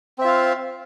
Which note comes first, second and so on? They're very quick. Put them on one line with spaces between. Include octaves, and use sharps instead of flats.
C4 E5 F4 F5